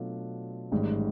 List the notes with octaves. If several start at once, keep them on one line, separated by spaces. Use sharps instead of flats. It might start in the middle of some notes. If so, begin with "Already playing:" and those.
Already playing: B2 F#3 A3 D4 F4
A1 G#2 D#3 G3